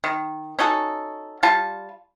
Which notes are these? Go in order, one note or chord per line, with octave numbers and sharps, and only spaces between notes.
D#3
C#4 D#4 F#4 A4
G3 F4 A5